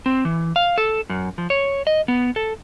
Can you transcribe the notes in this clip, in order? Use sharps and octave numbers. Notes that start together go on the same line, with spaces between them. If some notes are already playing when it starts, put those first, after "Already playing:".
C4
E3
F5
A4
F#2
F3
C#5
D#5
B3
A4